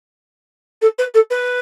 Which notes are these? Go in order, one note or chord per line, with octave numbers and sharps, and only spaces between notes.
A4
B4
A4
B4